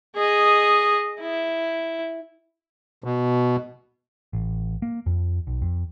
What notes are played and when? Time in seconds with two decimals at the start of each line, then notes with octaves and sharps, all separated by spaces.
0.16 G#4 D#5
1.20 E4
3.04 B2
4.33 A1
4.82 A#3
5.06 F2
5.47 B1
5.62 F2